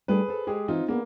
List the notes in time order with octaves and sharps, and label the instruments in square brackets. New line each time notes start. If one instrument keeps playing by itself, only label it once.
[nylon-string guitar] G3 A3 D4 [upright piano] G#4 B4
[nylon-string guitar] A4 C5
[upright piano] G#3 G4 G#4
[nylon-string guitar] E3 [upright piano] C4 D#4 F4
[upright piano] A#3 [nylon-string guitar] B3 D4 G#4